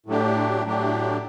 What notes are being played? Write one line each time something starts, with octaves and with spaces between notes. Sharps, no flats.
A2 F#3 A3 D4 G4
A2 F#3 A3 D4 G4